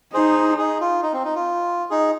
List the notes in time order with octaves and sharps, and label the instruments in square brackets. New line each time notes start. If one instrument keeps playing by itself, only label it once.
[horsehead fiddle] D#4 [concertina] G#4 C5
[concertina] D#4 G#4
F4
D#4
C4
D#4
F4
D#4 G#4